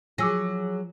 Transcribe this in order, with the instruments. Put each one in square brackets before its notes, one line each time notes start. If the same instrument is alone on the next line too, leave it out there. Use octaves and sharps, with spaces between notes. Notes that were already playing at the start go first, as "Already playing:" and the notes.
[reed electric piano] F3 [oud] F#3 G#4 [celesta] D6 E6 A#6